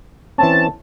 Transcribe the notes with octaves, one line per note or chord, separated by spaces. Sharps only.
E3 C4 C#4 A5